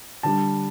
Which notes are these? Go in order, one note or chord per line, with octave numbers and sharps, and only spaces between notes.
D3 G3 D4 A5